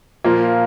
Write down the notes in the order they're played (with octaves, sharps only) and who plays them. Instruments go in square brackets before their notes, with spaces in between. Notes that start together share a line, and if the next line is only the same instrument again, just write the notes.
[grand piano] A#2 F3 A#3 F4